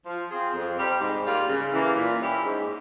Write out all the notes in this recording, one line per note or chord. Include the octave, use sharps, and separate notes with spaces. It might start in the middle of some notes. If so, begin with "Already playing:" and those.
F3
C4 F4 G#4 C5
F2
C3 G3 C4 G4
G#2
G3 A#3 F4
C#3
E3 A#3
A#2
G3 C#4 E4 G4
G#2